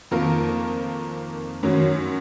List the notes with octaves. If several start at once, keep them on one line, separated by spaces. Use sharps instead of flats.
F2 D#3 A#3 F4 A#4
F#2 D#3 F#3